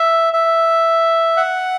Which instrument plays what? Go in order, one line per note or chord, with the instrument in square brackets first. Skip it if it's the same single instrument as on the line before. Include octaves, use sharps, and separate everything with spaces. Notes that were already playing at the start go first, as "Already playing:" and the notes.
Already playing: [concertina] E5
E5
F#5